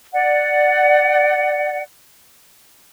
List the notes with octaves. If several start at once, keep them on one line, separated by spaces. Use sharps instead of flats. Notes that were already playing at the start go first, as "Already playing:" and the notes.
D5 F#5